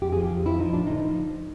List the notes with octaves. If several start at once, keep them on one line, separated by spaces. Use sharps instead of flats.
F2 G4
F3 G#4
G4
F2
F3 E4
F3 D#4
A2 D4
D3 D#4
F3